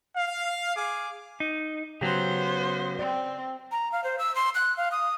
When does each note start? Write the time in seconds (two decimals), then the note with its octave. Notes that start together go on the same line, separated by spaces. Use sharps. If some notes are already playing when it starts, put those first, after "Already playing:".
0.16 F5
0.76 G#4 F5 D6
1.40 D#4
2.01 C#3 F#3 B3 G4 C5
2.99 C4 D5
3.72 A#5
3.92 F5
4.04 C5
4.19 E6
4.35 C6
4.55 F#6
4.77 F5
4.92 D#6